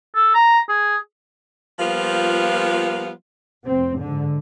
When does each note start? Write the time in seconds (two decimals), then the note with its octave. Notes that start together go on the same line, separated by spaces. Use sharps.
0.15 A4
0.34 A#5
0.69 G#4
1.79 F3 G3 A#3 B3 F4 F5
3.66 F1 C4
4.01 G#2 D3